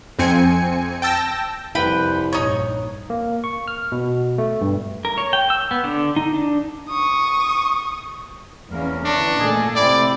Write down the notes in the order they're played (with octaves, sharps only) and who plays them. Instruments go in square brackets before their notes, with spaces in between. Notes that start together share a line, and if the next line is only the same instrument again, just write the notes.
[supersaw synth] F2 C4 G#5 C#7
G5 A5 E6 A#6
[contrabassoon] C2 [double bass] F2 [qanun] B4 G5 B5
[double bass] A#1 G2 [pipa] D#4 C#5
[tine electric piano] A#3
C#6
F6
B2
A3
G2
[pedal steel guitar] A#4
C#5
G5
E6
B3
D3
D#4
D4
[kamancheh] C#6 D#6
[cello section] E2 A#3 C#4 [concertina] A#4
[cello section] D3 E3 [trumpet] D4 [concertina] A#5 C#6
[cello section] A#2 A3 A4 [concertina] G#4 D#5 G#5
[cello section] A2 C3 C4 [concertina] E4 G5 [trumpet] D5